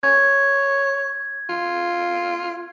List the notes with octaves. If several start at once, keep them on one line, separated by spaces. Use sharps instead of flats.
C#5 G#6
F4